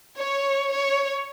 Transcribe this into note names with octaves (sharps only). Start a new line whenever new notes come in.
C#5
C#5